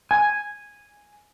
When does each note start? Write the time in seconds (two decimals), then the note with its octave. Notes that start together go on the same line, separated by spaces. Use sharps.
0.11 G#5